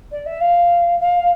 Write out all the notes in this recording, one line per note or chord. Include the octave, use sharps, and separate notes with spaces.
D5
E5
F5
F5